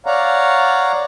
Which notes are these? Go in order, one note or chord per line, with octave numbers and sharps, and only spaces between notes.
C#5 D5 F5 F#5 A#5